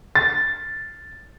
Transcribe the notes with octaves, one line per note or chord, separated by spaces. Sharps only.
A6